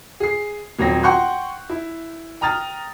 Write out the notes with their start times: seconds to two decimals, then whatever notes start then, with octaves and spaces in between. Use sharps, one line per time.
0.20 G#4 C7
0.79 D#1 F#3 C4 A#6
1.03 F#5 G5 C6 C#6 F#6 G6
1.69 E4
2.41 G5 A#5 D#6 F6 A6